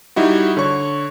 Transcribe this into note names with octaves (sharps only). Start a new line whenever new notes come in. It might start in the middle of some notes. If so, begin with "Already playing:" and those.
G3 D#4 E4 F#4
D3 C#5 C#6